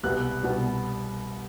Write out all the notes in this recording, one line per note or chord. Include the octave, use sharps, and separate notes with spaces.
C2 B2 G3 B3 F#6
C2 B2 G3 B3